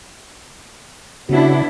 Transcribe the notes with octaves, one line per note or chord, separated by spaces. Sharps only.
C#3 B3 D4 E4 F#4